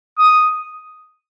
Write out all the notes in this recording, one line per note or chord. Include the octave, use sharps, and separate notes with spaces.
D#6